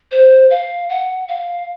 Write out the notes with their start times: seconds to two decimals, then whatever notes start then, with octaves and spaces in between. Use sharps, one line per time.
0.12 C5
0.50 F5
0.89 F#5
1.28 F5